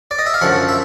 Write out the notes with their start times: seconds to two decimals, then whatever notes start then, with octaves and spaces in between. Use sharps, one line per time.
0.11 D5
0.19 D#5
0.26 E5
0.34 F5
0.41 F#2 D3 F3 F#5
0.69 E5